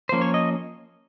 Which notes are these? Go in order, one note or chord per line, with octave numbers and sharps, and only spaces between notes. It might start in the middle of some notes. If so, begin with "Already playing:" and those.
F3 A#3 C#4 C5
C#5
D#5